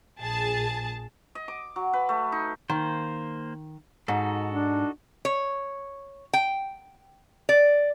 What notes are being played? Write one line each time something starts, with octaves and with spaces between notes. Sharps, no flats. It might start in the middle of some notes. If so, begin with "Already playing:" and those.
A#1 G#4 A5
D#5
D6
F#3
B4
A3
D#4
D#3 A#3 C5
G#2 D#4 F#4 A4
D4
C#5
G5
D5